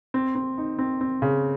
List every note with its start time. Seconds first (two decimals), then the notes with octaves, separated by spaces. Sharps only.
0.14 C4
0.35 C4
0.58 D#4
0.79 C4
1.01 C4
1.22 C#3